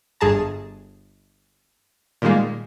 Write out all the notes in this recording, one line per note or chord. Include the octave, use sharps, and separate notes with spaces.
G1 G2 G#4 A5 A#5
A#2 D#3 G3 G#3 A#3